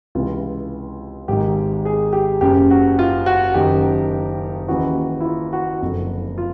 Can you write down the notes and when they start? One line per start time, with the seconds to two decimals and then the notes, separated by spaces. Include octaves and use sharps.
0.15 C#2 C3 E3 F4
1.28 G#1 G#2 D#3 G4
1.85 G#4
2.13 G4
2.41 F#1 F#2 C#3 G4
2.70 F#4
2.99 F4
3.26 F#4
3.54 F#1 F#2 D#3 G4
4.68 D#2 C#3 E3 F#4
5.21 E4
5.24 F4
5.53 F#4
5.82 F#1 F2 D3
6.38 F4